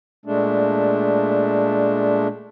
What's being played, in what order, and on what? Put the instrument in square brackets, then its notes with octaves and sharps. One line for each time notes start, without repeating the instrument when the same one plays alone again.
[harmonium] A#2 G#3 A3 D4